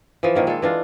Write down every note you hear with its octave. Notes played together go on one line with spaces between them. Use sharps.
E3 F3
A#2 D#3 A#3
G#3 A4
E3 D4 F4